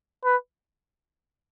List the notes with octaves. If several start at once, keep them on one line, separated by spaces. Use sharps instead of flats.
B4